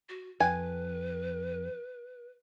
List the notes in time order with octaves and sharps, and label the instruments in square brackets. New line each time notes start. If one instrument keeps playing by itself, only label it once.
[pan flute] F#4
[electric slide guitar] F2 [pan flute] B4 [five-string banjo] G#5